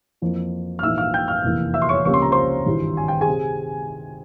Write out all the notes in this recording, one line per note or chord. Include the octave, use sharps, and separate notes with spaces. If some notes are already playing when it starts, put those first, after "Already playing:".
F2 E3 A#3
F6
A#1 G#2 E3 A#3 E5 E6
F5 F6
G5 G6
F5 F6
F1 E2 E3 A#3
E5 E6
C6
C#5 C#6
C#2 C3 F3 A#3 C#4 C#6
C6
A#5
C5 C6
G#1 G2 E3
G#5
G5
G#4 G#5
C3